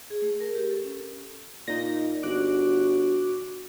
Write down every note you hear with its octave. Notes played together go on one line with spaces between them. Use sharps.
G#4
A3
A#4
G4
A4
C#4
A#2 D#4 A#6
G1 F#4 D6 F#6